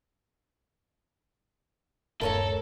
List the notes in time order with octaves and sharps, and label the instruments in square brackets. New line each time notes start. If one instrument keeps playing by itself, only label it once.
[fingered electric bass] D#1 G2 A3 [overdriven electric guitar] A4 [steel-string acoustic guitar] A#4 C#5 A#5